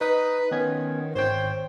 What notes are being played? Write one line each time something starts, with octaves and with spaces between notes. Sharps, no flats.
D#4 B4 D#6
D#3 B3 C#4 G#6
G#1 C5 C#5 G5